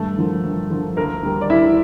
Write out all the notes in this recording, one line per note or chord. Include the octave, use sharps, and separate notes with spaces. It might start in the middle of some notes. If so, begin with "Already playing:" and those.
Already playing: G2 A3 A4
D3 F3 A#3
G2
D3 F3 A#3
D2 A#3 A#4
D3 G3 A#3
D5
D2 E4 E5